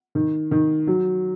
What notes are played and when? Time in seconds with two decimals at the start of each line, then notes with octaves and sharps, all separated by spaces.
0.15 D#3
0.51 D#3
0.87 F#3